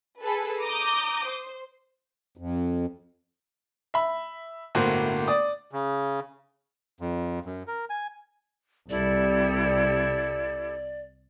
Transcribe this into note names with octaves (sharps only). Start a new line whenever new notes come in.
G#4 A4 B4
A#5 D6 D#6 G6
C5
F2
E5 B5
G1 A2 A#3 F#4 C5
D5 D#6
C#3
F2
F#2
A#4
G#5
C2 C3 G3 E4 G4 A4 D5